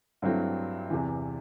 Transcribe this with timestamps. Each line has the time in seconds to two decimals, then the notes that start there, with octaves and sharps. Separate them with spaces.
0.22 G2 F#3 A3 C4 E4
0.90 E2 C3 E3